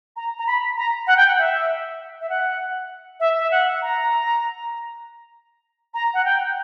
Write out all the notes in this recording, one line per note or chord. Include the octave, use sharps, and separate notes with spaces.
A#5
A#5
B5
A#5
F#5
G5
F#5
E5
E5
F#5
E5
E5
F#5
A#5
A#5
F#5
G5